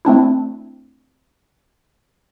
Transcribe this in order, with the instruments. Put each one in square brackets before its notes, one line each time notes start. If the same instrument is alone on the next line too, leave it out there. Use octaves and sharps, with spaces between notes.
[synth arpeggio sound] A3 C4 D4 E4